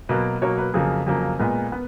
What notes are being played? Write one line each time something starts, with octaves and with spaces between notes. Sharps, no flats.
B2 F#3 A#3 B4
B2 F#3 A#3 C#5
B4
F2 C#3 F#3 A#3 G#4
F2 C#3 F#3 A#3
A#2 G#3 B3 A#4
B3